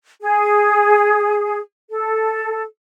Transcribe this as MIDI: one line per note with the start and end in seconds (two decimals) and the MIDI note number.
0.21 1.58 68
1.90 2.62 69